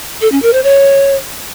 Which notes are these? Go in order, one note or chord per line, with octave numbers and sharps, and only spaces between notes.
A4
C#4
A#4
C5
C#5